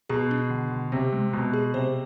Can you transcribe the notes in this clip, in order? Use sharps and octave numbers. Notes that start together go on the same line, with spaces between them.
B2 G#4
D4
D3
D3
C3 C4
G#3
B2 G#3
G#4
C3 C5